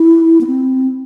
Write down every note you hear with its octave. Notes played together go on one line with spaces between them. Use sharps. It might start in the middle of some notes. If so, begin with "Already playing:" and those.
Already playing: E4
B3
C4